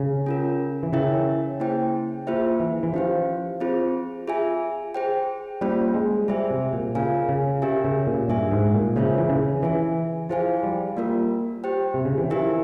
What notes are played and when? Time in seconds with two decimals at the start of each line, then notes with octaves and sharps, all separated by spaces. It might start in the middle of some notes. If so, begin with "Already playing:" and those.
Already playing: C#3
0.26 C#4 F4 A#4
0.83 E3
0.93 C#3 E4 A#4 C#5 E5 G5
1.60 A#3 E4 G#4 C5 G5
2.27 A#3 F4 G#4 C5 E5
2.60 E3
2.83 E3
2.93 F3 C#4 G4 C5 F5
3.60 C4 F4 G#4 C5
4.28 F4 G#4 E5 G#5
4.94 G#4 C5 G5
5.61 G3 A#3 C#4 F4 C5
5.94 G#3
6.28 G3 G#4 C5 E5 G#5
6.50 C3
6.73 A#2
6.95 C#3 F4 A#4 F5 G#5
7.29 C#3
7.62 C#4 G4 A#4 E5 G#5
7.84 C#3
8.07 A#2
8.29 G2 G#4 E5 G#5
8.52 G#2
8.74 A#2
8.96 C#3 C#4 F4 C5 E5
9.18 E3
9.29 C#3
9.63 E3 G#4 E5 G#5
10.29 F3 E4 G#4 C5 F5 G#5
10.63 G3
10.97 G3 A#3 F4 A#4
11.64 G4 C5 G5
11.94 C3
12.05 C#3
12.18 E3
12.30 F3 E4 G4 A#4 E5 G#5